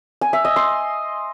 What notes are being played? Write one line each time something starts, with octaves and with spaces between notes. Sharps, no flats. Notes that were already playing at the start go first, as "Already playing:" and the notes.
G#5
E5
D#5
C6